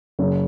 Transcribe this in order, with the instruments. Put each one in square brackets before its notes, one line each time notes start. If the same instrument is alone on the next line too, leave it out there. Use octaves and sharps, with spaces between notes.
[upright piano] F#1